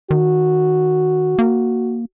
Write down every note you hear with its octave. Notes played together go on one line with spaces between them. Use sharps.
D#3 F#4
A#3